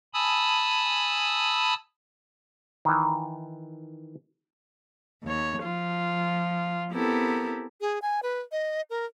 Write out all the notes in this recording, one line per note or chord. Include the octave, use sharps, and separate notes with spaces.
G#5 A5 B5 D#6 E6
D#3 E3
D#2 C#5
F3 F4
B3 C4 E4 G4 A4 A#4
G#4
G#5
B4
D#5
A#4